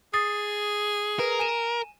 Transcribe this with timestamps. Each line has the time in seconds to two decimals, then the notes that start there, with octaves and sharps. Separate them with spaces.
0.14 G#4 D#6 A6 C7
1.19 A#4 B4
1.39 G#5 D#7 E7